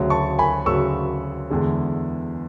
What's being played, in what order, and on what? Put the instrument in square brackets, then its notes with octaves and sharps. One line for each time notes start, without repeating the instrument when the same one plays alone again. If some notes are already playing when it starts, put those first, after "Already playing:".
Already playing: [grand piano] D2 C#3 F#3
A5 C#6
G#5 B5
D2 C#3 F#3 C#6 E6
E2 D3 G#3